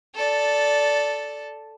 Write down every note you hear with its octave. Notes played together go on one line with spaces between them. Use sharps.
A4 D5